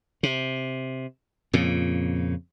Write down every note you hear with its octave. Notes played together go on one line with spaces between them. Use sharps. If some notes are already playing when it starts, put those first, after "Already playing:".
C3
F2 A#2 C#3